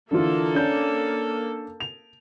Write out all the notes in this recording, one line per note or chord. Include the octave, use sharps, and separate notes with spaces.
D3 E3 A#3 F4 A4
C#4 D4 G6
F7